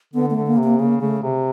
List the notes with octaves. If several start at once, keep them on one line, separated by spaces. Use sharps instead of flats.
D3 B3
A3
D3
A#3
C3
A#3
C#3 A#3
C#3 A3
C3